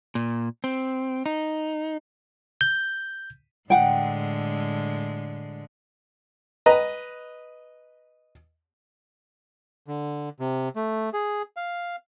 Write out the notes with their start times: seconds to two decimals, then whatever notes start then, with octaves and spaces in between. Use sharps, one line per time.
0.15 A#2
0.64 C4
1.26 D#4
2.61 G6
3.70 A2 D3 G#3 F#5 G5
6.66 B4 D#5 A#5
9.87 D3
10.40 C3
10.76 A3
11.13 G#4
11.57 F5